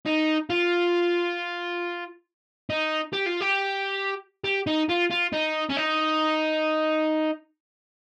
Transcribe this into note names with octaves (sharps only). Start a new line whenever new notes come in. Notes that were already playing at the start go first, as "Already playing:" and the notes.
D#4
F4
D#4
G4
F4
G4
G4
D#4
F4
F4
D#4
C#4
D#4